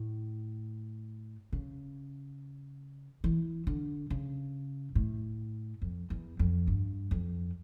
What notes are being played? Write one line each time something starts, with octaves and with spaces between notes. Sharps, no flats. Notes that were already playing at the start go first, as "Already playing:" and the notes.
Already playing: A2
C#3
E3
D3
C#3
A2
F2
E2
F2
G2
F2